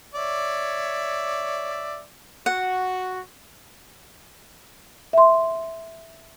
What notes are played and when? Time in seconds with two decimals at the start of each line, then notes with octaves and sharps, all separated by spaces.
0.14 C#5 D5 E5
2.46 F#4 F#5
5.13 E5 C6